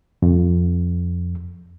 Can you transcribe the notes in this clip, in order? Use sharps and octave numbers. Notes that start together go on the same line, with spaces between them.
F2